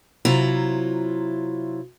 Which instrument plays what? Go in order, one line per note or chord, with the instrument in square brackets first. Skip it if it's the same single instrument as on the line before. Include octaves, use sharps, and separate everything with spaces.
[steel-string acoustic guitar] C3 F#3 E4 F4 A#5